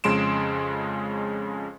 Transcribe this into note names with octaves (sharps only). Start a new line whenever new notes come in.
F2 C#3 G#3 C6 D7 E7